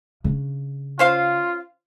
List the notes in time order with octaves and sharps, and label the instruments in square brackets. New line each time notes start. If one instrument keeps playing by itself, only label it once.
[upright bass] C#3 D4
[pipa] C#4 C5 F5 [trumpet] F4